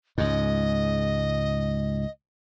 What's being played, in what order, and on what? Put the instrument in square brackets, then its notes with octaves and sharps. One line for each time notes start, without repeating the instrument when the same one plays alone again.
[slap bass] C#2 G#2 [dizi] D#5